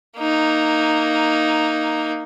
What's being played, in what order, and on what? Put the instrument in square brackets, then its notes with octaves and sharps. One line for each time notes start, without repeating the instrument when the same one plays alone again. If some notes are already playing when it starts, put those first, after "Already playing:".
[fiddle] A#3 D#4